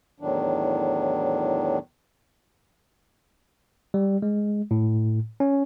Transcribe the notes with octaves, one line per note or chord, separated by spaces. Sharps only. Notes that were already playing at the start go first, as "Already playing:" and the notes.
E2 A2 D#3 F#3 D4
G3
G#3
A2
C#4